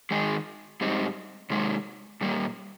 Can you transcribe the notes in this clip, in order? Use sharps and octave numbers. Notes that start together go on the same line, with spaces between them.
D#3 G#3 D#4 G#4
G#2 G3 C4 D#4
C3 D#3 G#3
A#2 G3 A#3